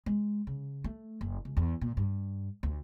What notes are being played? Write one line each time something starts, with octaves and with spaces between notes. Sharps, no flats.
G#3
C#3
A3
F#1
C#2
E2
A#2
G2
D2